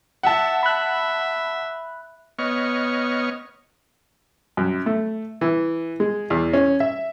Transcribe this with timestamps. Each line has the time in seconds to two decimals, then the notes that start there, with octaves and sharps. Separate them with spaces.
0.23 E5 F#5 A5
0.63 E5 B5 F#6
2.39 B3 C#5 D#5 C#6 F6
4.57 F#2
4.86 A3
5.41 E3
6.00 G#3
6.30 E2
6.53 C#4
6.80 E5